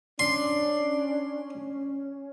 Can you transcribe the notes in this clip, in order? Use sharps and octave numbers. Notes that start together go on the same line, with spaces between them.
C#4 D4 C6